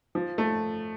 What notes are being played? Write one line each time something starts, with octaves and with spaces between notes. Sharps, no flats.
F3
A3